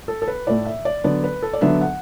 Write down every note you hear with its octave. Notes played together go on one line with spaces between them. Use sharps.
A4
A4
B4
A2 A3 E4 D5
E5
D5
D3 F#3 B3 D4 D5
B4
A4
D5
D3 F#3 B3 D4 E5
F#5